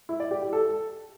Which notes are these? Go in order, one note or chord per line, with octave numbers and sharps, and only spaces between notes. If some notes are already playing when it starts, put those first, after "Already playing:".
E4
D5
G4
G4
A4